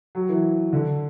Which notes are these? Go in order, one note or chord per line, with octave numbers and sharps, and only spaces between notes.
F#3
E3
D3